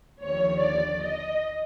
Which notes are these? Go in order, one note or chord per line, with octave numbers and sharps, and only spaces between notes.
D#2 D3 F3 C#5
D5
D#5